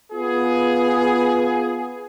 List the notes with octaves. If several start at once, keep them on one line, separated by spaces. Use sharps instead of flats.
B3 F4 G#4